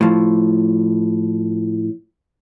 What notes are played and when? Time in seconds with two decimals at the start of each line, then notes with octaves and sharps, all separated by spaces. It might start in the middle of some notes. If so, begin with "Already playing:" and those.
0.01 A2 F3